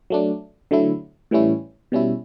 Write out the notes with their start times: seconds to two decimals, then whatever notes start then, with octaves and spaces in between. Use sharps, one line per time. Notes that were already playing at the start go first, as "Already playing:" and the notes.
0.10 F#3 A3 D4
0.71 D3 F#3 A3 E4
1.31 A2 E3 G3 C#4 E4
1.92 B2 G3 C#4 E4